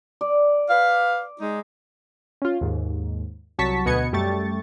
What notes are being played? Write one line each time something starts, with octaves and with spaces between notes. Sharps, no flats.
D5
B4 F5
G#3 D#4
C#4 F4
D#2 G#2
C2 F#3 A5 C#6 B6
D2 B2 B3 D#5 G#6 C#7
F#2 G3 A3 G4 C#6 A6